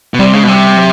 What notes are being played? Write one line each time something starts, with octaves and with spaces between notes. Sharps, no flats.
B2
C3 G3
C#3 G#3
B2
C3 G3
F#3